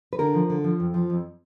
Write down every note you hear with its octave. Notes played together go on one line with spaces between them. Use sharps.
B4
D3 A#4
F3
D3
F3
F2
F3
F2